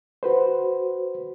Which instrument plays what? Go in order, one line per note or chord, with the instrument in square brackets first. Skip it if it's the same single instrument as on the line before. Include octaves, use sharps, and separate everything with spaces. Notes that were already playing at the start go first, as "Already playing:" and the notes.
[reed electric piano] F#4 B4 C5